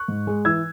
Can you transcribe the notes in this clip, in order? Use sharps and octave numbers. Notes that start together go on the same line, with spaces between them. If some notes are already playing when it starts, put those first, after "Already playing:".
Already playing: C#6 F#6
G#2
G#3
E3 E6 G#6